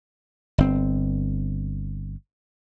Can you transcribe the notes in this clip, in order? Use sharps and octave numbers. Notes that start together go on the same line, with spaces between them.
G1 C4